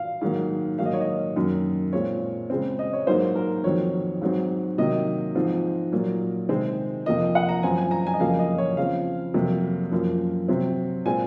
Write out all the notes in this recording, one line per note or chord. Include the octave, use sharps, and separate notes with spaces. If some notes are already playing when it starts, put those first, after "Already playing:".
Already playing: F5
G#2 D#3 F#3 A#3
G#2 D#3 F#3 A#3 F5
D#5
C#5
D#5
F#2 D#3 A#3
A#2 G#3 C4 C#5
C#3 G#3 C4
D#5
C#5
G#2 F#3 A#3 C5
A#4
F2 D#3 F#3 C4 C#5
G#2 F#3 C4
C3 D#3 F#3 A#3 D#5
G#2 F3 C4
A#2 F#3 A#3
C3 D#3 G#3 C4
F2 C3 F3 A#3 D#5
F#5
A#5
F#2 F3 C4 G#5
G#5
A#5
G#5
D#5
F2 C#3 F#3 A#3 F5
D#5
C#5
C#3 F3 C4 F5
F2 C3 F#3 A#3
F#2 F3 A#3
C3 F#3 C4
A#2 G#3 C4 G#5